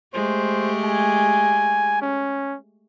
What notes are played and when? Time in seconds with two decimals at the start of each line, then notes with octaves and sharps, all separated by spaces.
0.14 G#3 A3 G4 C5
0.84 G#5
2.02 C#4